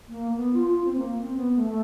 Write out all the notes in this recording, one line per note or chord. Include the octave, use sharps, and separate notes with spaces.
A#3
B3
F4
F4
C4
A#3
C4
B3
A3
A3